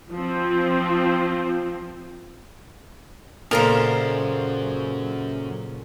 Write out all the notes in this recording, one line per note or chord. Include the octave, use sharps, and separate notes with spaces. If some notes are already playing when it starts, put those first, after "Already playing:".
F3 C4
F#2 A#2 C#3 A4 A#4 C5